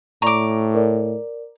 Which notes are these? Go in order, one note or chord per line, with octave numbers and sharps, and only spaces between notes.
A2 D5 A#5 C#6 D6
A#4 D5